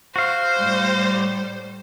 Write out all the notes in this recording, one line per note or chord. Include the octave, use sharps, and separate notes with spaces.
F#4 C5 F5
A2 G3